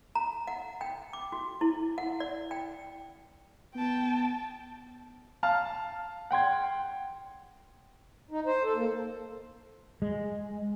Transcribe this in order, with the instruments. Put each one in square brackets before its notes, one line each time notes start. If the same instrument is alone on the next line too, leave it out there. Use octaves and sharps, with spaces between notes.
[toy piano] A#5
F#5
G5
D6
F#4
E4
F#5
D5
G5
[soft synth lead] B3 [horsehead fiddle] G5 A5
[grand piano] F5 A5 F6
F#5 G5 C6 G#6
[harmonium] D#4
C5
A4
A#3
[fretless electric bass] G#3